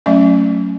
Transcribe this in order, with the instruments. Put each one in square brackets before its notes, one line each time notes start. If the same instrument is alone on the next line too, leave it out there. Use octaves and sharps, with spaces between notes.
[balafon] F#3 A3 C#4 E5